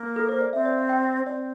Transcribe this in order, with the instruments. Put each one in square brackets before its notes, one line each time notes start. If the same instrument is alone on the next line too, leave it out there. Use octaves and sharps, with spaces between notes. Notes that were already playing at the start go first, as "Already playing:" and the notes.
Already playing: [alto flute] A#3
[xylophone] A4
C5
D5
[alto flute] C4 [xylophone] E5
[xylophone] D5
F5
G5
[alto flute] C4 [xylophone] D5